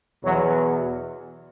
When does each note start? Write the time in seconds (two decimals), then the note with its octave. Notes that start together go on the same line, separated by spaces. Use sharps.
0.25 E2 B2 F#3